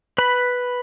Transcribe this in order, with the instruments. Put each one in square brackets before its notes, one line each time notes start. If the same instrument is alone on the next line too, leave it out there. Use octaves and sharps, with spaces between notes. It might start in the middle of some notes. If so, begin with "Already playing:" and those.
[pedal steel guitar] B4 B5